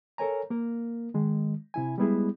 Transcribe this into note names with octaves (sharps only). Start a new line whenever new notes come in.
A4 A#4 C#5 G#5 A#5
A#3 A#4
D#3 G#3
C3 E4 G#5
G3 G#3 B3 E4 G#4